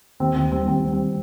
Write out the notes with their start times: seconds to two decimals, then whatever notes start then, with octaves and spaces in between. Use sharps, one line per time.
0.20 D#2 C4
0.36 D#2 C4
0.52 G3 C4
0.68 D#2 C4
0.85 G3
0.92 C4